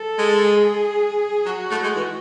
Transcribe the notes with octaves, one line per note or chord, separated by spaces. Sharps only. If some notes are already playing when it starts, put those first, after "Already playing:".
Already playing: A4
G#3
G#4
F#3 F#4
A3
G#3
E3